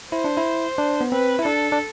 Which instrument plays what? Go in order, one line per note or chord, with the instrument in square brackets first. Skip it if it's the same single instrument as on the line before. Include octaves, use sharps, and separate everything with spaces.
[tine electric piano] E4 [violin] C5
[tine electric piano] D4
E4
D4
B3
[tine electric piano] C4 [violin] B4
[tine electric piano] E4
[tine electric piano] D4 [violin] A4
[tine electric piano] D4